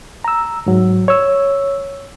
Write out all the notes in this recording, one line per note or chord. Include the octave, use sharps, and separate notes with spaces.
A#5 E6
G#2 F#3
C#5 E6